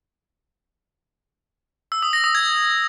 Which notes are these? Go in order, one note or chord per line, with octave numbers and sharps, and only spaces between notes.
E6
D#6
A#6
D#6
G#6